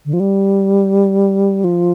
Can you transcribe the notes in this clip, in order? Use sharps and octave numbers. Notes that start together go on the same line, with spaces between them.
D3
F3
G3
F3